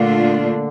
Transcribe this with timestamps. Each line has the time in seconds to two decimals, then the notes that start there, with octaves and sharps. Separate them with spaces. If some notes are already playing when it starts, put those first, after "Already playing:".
Already playing: A#2 D3 A3 D4 F4